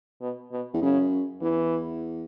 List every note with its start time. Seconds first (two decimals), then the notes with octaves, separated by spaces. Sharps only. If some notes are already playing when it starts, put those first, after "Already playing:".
0.21 B2
0.52 B2
0.74 E2
0.81 F#2 C#3
1.41 E2 E3